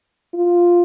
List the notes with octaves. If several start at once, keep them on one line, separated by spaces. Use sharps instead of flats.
F4